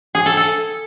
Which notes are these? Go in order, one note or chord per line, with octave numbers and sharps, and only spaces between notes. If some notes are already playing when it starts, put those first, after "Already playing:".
G#4
A4
A4